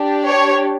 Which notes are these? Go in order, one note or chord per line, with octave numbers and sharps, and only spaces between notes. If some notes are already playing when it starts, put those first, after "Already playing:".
Already playing: D4 G4
C#5